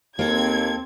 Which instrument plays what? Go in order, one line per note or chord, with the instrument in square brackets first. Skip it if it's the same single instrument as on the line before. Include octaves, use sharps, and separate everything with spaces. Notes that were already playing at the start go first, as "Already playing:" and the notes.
[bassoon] D#2 [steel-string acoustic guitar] A#3 A4 [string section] C4 G#6